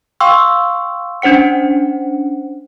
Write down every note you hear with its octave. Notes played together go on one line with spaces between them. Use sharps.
F5 G5 C6 C#6 E6
C#4 D4 C5 F#5 C#7